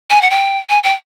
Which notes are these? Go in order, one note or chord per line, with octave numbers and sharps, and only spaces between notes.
G#5
F#5
G5
G#5
G5